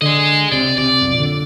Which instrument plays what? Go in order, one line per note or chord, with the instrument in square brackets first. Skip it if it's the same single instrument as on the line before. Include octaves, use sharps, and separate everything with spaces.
[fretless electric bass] D3 [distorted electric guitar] G#4 D#5
[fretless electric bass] C2 C3 [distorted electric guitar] D5
[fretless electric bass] C3 [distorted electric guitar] D5
[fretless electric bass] B1 F2
A#2 D3